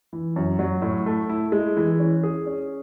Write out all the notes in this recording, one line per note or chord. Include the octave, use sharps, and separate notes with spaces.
E3
F#2
F#3
A2
A3
E4
G#3
E3
C#4
G#4
C#4